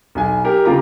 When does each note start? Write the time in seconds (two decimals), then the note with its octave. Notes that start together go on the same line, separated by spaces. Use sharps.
0.15 B1 G#5
0.45 G4 A#4
0.65 C#3 F4 G4 A#5 D6